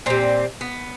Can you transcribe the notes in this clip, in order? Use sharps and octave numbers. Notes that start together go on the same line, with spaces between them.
A#2 G3 C4
B3